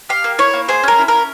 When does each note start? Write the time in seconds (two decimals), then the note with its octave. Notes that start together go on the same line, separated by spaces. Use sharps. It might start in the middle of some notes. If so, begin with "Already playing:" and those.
0.09 G4 F5
0.24 A#3
0.38 E4 C#5
0.54 A#3
0.68 G#4 C5
0.83 C#4 A#4
0.99 E4
1.08 C#4 A#4